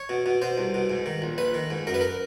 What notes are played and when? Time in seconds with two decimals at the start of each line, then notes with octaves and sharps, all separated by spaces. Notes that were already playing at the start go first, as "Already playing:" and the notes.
Already playing: C#5
0.09 B2
0.26 B2
0.42 B2 C5
0.58 C2
0.74 B2
0.90 G#2
1.06 D#3
1.22 A#1
1.38 A#1 B4
1.54 D#3
1.71 G#2
1.87 F#2 A#4
1.94 B4
2.01 A#4